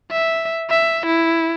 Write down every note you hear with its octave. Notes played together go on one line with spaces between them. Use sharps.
E5
E5
E4